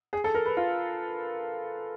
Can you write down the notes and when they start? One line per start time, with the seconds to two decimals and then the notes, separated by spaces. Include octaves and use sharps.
0.13 G#4
0.24 A4
0.35 A#4
0.46 B4
0.57 F4